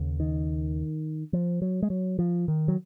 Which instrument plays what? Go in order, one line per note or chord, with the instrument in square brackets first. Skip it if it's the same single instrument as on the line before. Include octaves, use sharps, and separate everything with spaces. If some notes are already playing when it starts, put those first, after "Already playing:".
Already playing: [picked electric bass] D#2 C#3
D#3
F3
F#3
G#3
F#3
F3
D#3
F#3